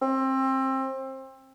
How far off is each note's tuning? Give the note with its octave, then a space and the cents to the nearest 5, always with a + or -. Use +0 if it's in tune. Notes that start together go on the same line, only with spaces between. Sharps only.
C4 +25